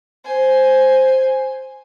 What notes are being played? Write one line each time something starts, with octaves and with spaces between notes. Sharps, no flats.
C5 G#5